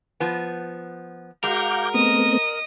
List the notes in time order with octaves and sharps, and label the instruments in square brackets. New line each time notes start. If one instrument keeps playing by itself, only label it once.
[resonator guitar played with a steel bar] F3 B3
[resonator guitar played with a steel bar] G#3 [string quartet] F#4 [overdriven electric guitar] A#4 [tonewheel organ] F5 D6 G6
[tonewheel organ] A3 B3 C4 [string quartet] D#5 D#6